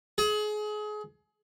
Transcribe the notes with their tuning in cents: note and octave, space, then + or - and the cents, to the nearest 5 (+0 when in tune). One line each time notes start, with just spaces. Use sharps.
G#4 +30